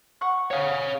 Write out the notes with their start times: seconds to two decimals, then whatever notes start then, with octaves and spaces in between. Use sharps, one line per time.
0.21 F#5 C#6 F#6
0.51 C#5 F5